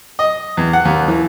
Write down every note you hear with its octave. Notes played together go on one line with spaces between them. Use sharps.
D#5
E2
F#5
D#2
E3